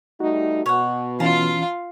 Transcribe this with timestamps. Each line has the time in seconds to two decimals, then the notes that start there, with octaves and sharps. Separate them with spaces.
0.20 G3 A3 D#4 F#4
0.66 B2 C#5 F#5
1.20 E3 C#4 F4 F5 A5 A#5